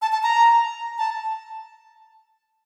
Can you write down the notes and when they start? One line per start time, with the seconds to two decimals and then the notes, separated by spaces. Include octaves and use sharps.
0.02 A5
0.12 A5
0.23 A#5
0.98 A5